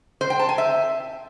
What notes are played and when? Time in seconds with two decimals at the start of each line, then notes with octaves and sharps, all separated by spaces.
0.21 C5
0.30 G5
0.39 A5
0.49 G#5
0.58 E5